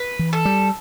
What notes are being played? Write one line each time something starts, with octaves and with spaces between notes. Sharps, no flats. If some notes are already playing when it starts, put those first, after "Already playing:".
Already playing: B4
E3
A4
G3